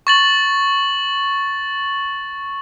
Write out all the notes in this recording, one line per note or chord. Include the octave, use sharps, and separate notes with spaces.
C#6 A6 F#7